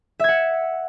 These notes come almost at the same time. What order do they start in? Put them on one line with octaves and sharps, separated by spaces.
E5 G#6 F#5